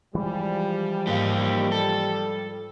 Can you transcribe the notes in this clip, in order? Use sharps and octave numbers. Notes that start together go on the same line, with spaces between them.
E3 F3 G3 G#3
G#2 A#3 G4 F5
A4